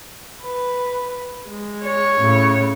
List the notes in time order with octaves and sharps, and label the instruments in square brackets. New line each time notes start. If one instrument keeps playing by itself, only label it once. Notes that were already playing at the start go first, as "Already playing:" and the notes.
[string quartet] B4
G#3
[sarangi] C#5
[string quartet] A2 C#3